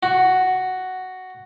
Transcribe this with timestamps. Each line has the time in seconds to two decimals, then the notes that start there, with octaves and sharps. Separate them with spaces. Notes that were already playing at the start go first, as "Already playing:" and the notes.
0.03 F#4